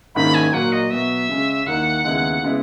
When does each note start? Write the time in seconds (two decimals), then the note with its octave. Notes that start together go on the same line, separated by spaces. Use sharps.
0.15 G#2 D#3 A#3 C#4 E4 B5
0.34 G#5
0.53 A#2 F#3 A#3 F#5
0.72 D#5
0.91 B2 F#3 B3 E5
1.29 C#3 G#3 C#4
1.66 D#2 D#3 A#3 E4 F#5
2.04 D#2 C#3 G#3 B3 E4
2.43 C#3 G#3 B3 E4